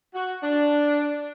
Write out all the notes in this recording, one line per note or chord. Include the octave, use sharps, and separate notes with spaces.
F#4
D4